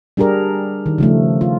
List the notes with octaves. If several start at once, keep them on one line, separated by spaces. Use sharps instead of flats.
G3 D4 G4 G#4 A#4
D#3
C#3 F3 A3
F4